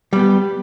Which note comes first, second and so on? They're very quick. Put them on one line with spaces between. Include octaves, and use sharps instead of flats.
G3 B3 G4